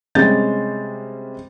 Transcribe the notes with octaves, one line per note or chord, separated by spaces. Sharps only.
C3 G3 G#3 C#4 G6 A6